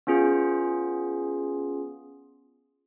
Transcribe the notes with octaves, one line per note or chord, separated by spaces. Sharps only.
B3 C#4 F4 G#4